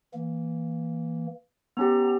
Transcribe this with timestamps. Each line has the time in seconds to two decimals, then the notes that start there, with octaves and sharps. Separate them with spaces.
0.14 E3 A#3
1.77 B3 C#4 G4 A#5